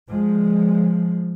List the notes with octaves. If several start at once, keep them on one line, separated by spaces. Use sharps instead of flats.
F3 G#3